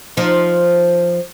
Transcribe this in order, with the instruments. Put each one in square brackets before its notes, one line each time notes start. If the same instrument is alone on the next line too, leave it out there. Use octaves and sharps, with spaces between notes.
[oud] F3 D#4